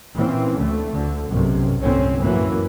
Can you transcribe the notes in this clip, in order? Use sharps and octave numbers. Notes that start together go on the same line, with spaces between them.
A#2 E3 C4 C#4
D2 D3 A3
D2 D3
B1 F#2 C3
G1 C2 A2 A3 C4 C#4
F#2 A2 E3 F#3 A#3